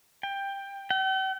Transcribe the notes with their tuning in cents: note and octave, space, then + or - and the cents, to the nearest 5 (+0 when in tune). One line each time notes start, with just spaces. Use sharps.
G5 +15
G5 -45